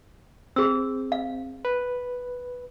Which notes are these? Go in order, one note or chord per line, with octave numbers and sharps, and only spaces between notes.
C4 G#4 E6
F5
B4